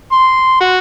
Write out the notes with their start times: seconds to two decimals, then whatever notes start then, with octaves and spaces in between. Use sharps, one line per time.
0.12 C6
0.60 F#4